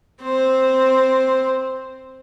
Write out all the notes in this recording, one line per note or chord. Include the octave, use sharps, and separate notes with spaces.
C4 C5